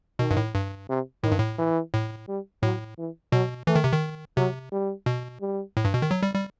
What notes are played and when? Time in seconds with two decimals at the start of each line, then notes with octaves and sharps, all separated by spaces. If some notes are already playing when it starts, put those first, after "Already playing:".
0.19 B2 D#3
0.31 G2
0.37 A2
0.54 G2
0.89 C3
1.24 A2 D#3
1.31 G2
1.39 A2
1.58 E3
1.94 A2
2.28 G3
2.63 A2 F#3
2.98 E3
3.32 B2 F#3
3.67 E3 A3
3.76 D#3
3.84 C3
3.92 D#3
4.37 C3 F#3
4.72 G3
5.06 B2
5.41 G3
5.77 A2
5.85 G2
5.94 B2
6.02 D#3
6.11 F#3
6.23 G3
6.34 G3